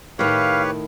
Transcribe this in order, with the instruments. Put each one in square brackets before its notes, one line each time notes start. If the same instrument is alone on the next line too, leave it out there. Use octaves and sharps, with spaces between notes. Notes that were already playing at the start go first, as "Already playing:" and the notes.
[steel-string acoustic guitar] A2 D#3 [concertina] G4 B4 C#5 [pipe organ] F5